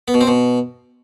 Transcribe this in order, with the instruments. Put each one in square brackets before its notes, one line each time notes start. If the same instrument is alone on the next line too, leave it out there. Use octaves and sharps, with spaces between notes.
[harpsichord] B3
B2
C4
B2